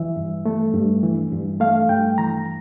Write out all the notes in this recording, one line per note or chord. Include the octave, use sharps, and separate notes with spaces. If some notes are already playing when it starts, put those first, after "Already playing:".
Already playing: E3 E5
G2
A3
G2
E3
G2
A3 F5
G2 G5
E3 A#5